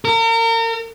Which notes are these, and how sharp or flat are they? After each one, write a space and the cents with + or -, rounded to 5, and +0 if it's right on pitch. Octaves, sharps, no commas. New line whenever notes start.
A#4 -35